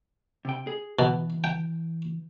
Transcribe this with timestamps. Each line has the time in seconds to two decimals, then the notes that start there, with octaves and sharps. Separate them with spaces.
0.45 C3 G5
0.67 G#4
0.99 B2 E3
1.44 G5